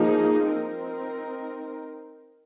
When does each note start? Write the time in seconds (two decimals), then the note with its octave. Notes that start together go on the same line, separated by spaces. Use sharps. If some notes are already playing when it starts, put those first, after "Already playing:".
Already playing: F3 A#3 D#4 G#4
0.48 C4 D#4 A#4